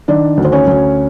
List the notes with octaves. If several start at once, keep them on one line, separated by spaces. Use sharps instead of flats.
D#3 D4 D5
D2
C5
C#4 C#5
D2